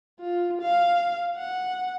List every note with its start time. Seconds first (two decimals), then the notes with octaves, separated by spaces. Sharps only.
0.20 F4
0.61 F5
1.37 F#5